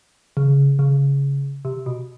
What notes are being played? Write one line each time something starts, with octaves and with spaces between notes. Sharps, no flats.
C#3
C#3
C3
B2